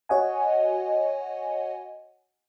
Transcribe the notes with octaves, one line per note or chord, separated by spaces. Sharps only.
F#4 C#5 D#5 F#5 G#5